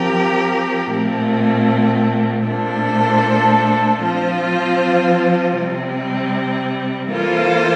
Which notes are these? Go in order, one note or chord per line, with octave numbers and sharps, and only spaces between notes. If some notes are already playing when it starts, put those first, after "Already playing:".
Already playing: F3 C4 G4 A#4
A#2 A3 C4
A#2 A3 D4 A4 C5
F3 C4 F4 C5
C3 G3 C4
E3 A#3 F4 A4 C5